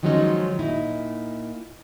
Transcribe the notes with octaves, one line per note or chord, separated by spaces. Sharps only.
D#3 F3 F#3 G#3 C#4 D#4
A#2 D#4 E4